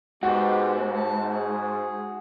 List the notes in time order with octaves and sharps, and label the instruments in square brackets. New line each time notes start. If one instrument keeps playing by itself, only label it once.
[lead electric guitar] G#2 [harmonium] G#3 B3 G4 [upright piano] F#4
[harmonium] A5
G#4